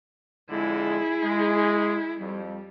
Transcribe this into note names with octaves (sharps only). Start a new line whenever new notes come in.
F2 D3 G#3 E4 G#4
G#3
F2 G3